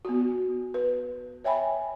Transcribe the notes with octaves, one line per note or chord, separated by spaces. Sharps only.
B3 F#4
B4
C#5 E5 G5 G#5 B5